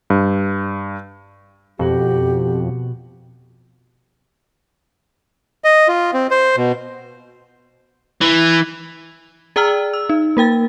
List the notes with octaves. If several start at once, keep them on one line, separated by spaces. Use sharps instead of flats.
G2
F2 B2 F#4 G4
D#5
F4
C4
C5
B2
E3
G#4 D5 G5 A#5 E6 F6
E6
D#4
A#3 A#4 G5 A6